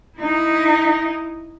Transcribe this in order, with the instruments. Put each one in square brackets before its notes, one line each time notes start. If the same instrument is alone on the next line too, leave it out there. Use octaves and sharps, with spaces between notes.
[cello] D#4 E4